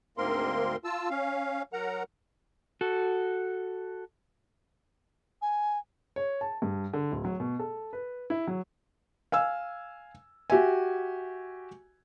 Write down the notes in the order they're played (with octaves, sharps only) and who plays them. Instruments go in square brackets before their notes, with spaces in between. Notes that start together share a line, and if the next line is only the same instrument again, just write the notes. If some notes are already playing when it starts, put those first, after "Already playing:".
[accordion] D2 G#2 A#3 C4 A#4 C6
F4 A5 E6
C#4 F5
F#3 A#4 F#5 A#5
[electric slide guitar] F#4 A4
[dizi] G#5
[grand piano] C#5
A5
G2
D3
D1
F#3
B2
A4
B4
E4
F#3
[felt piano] F5 G#5 E6
F#4 G4 E5 G#5